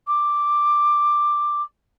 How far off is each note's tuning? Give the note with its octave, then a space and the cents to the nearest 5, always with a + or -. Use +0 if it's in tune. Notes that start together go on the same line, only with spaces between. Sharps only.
D6 +5